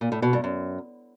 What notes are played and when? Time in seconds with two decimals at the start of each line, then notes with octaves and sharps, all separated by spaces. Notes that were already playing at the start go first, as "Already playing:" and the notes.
0.01 A#2
0.12 A2
0.22 B2
0.33 G2
0.44 F#2